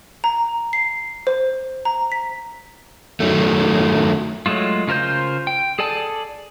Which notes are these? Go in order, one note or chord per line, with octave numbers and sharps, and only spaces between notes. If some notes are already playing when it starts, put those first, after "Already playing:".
A#5
C7
C5
A#5
B6
D#3 F#3 A3
F#3 G#3 A3 F4
C#3 F4 A#4 C5 G6
G5
G#4 A4 D5 G#5 A5